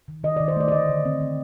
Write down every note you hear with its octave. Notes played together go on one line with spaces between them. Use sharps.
D#3
D#3 D#5
D#3 D5
C5
A3 D5
D5
D3 D#5
D3
C4
D3